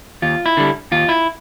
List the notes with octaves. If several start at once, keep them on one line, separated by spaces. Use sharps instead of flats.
D#2 F4
E4
D3 G3
D#2 F4
E4